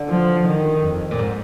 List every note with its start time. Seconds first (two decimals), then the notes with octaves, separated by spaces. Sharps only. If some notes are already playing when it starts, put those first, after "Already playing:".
Already playing: D3
0.09 F3
0.46 D#3
0.82 F2
1.11 A#2
1.19 G#2